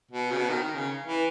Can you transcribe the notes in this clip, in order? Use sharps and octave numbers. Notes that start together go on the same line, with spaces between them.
B2
C#3
B2
D#3
D#3
C#3
E3